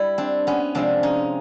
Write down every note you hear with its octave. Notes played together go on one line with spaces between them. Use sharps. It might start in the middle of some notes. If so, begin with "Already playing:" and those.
Already playing: G3 E4
C4 D4
B3 C#4
C3 F3 G#3 C4 D4
C#4 D#4